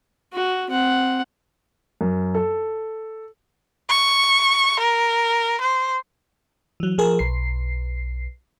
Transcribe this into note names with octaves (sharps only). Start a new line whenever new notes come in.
F#4
C4 F#5
F#2
A4
C#6
A#4
C5
E3 F#3
F3 G#4 A#4
B1 C7